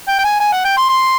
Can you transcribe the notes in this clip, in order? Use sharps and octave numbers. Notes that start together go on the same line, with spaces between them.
G5
G5
G#5
G#5
F#5
G5
C6
C6